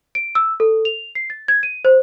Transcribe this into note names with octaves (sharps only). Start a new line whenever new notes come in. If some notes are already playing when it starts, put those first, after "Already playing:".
D7
E6
A4
F7
C7
A6
G#6
D#7
C5